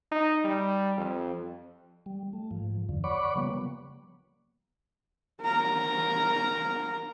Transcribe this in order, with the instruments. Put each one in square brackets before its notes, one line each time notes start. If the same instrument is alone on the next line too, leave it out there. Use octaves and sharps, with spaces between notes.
[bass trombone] D#4
G3
F2
[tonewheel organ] G3
A3
G#2 F3
E2 G2 D3 F3
C#5 D5 F#5 B5 C#6 D6
C#3 F3 G3 A#3 B3
[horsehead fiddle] A#4 A#5